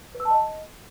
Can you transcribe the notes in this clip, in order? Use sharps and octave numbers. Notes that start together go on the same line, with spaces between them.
B4
E6
A5
D#5